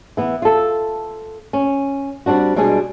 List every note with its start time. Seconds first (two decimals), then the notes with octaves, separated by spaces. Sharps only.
0.17 E3 B3
0.42 F4 A4
1.53 C#4
2.26 G3 C4 D4 F#4
2.56 B2 G3 G#3 D4 G#4